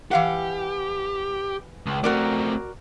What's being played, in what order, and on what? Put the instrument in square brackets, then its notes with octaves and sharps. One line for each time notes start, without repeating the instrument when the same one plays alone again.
[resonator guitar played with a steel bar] E3 F5 F#5 [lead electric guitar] G4
[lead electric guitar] C#2
[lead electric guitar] A3 C4 [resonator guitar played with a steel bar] F#4 A#4 D5